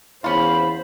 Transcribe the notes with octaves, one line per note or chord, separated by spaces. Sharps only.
E2 C#4 F4 C5 B5